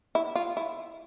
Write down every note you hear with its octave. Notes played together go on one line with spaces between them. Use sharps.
E4
F4
E4